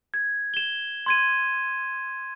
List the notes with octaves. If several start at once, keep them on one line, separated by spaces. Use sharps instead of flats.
G#6
E7 G7
C6 G#6 D#7